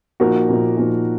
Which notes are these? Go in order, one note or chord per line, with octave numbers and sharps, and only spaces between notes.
A#2 F3 A#3 D#4 F#4 A#4
A#2 F3 A#3 D#4
A#2 F3 A#3 D#4